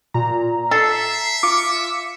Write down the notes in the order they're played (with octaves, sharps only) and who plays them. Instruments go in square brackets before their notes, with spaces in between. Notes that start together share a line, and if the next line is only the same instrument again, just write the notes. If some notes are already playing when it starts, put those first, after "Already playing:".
[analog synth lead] A#2 [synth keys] A#5
[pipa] A4 [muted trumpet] E5 [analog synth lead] C7
[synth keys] F4 D6 [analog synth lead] C#7